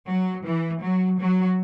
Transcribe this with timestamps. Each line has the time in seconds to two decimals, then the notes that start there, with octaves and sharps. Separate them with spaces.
0.09 F#3
0.46 E3
0.83 F#3
1.20 F#3